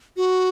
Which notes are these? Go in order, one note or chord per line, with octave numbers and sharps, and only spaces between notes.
F#4